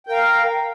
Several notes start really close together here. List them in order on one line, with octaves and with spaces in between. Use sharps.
G5 A#4 F5